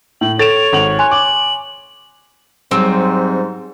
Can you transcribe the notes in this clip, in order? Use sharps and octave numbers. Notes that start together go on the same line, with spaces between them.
A2 F#7
A4 C#5 A6 D7 E7 F7
G#1 F#7
G#5 C6 F#6 F7
D6 F#7
G#2 F#3 G3 C4